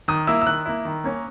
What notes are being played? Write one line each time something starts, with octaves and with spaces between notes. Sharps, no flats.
D#3 D#6
A#3 E4 E6
E6
D#3 F#6
A#3 E4
D#3
A#3 C#4